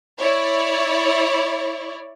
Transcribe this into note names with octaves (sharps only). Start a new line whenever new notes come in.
E4 C#5 D5